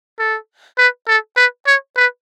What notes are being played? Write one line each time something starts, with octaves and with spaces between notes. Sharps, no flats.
A4
B4
A4
B4
C#5
B4